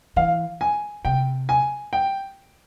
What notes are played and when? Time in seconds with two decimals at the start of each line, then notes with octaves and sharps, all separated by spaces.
0.16 E3 F5
0.61 G#5
1.05 C3 G5
1.49 G#5
1.93 G5